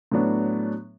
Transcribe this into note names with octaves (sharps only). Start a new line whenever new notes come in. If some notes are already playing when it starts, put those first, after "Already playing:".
A2 F#3 B3 D4